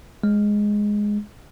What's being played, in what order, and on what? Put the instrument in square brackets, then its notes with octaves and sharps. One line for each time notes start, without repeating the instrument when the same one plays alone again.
[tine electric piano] G#3